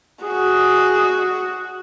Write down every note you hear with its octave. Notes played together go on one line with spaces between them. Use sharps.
F#4 G#4